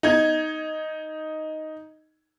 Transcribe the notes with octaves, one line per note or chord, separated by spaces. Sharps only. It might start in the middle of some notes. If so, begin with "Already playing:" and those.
D#4 G#6